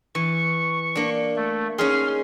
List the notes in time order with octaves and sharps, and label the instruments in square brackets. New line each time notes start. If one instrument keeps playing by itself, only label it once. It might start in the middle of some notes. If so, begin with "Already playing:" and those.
[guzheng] E3 [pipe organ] C#6
[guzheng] A#3 D4
[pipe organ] A3
[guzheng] C#4 D#4 G#4 [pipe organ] C6 F6